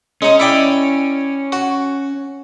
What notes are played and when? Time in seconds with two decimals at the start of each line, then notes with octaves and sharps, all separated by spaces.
0.22 G#3 C#4 D#4
0.39 E4 D5 G5
1.52 F#4